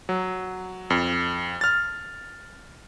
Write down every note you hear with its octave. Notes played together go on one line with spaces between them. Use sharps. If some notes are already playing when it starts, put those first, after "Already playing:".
F#3
F2
F6 A6